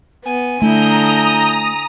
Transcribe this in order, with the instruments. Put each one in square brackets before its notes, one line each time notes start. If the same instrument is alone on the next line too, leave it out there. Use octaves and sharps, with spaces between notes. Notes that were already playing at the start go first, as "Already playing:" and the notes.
[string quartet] B3 [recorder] G#5
[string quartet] D3 E4 G6 [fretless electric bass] A3 [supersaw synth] A#5 D#6